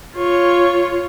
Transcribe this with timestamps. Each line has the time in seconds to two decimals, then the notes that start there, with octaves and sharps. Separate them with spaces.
0.15 F4 C#5